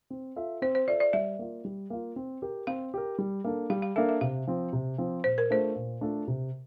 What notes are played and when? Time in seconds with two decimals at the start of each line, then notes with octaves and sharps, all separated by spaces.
0.10 C4
0.36 F4 A4 E5
0.62 C4 C5
0.75 C5
0.87 F4 A4 D5 E5
1.00 D5
1.13 G3 E5
1.39 A#3 F4
1.65 G3
1.90 A#3 F4
2.16 C4
2.42 G4 A#4
2.67 C4 F5
2.94 G4 A#4
3.18 G3
3.44 A#3 D4 A4
3.70 G3 F5
3.82 F5
3.96 A#3 D4 A4 E5
4.09 E5
4.21 C3 F5
4.47 F3 C4
4.73 C3
4.98 F3 C4
5.24 A#2 C5
5.38 A#4
5.50 A3 D4 F4 A4 C5
5.75 A#2
6.01 A3 D4 F4 A4
6.27 C3